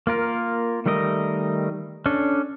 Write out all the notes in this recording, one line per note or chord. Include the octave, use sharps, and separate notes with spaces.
A#3 F4 A#4
D#3 G3 A3 A#4 D#5
C#4 D4 A4